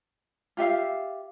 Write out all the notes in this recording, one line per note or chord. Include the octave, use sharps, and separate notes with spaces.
F4 G4 E5 F5